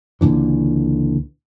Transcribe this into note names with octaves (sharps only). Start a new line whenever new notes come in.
C#2 A#2 D3 E3